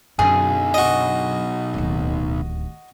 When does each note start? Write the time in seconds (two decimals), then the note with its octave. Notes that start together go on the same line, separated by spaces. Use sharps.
0.19 B1 F#2 D3 G#4
0.74 F#4 D#5
1.74 D1 D#2